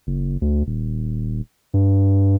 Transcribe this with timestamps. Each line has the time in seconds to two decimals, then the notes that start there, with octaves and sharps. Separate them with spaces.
0.07 F#1
0.42 D2
0.67 D#1
1.74 G2